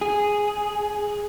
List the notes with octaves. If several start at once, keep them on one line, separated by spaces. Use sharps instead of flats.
G#4